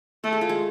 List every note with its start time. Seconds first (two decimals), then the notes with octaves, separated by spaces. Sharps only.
0.24 A3 A4
0.33 G#4
0.41 F4
0.49 G#3 G#4